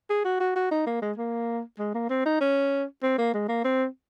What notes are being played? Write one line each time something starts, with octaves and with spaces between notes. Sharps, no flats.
G#4
F#4
F#4
F#4
D#4
A#3
G#3
A#3
G#3
A#3
C4
D#4
C#4
C4
A#3
G#3
A#3
C4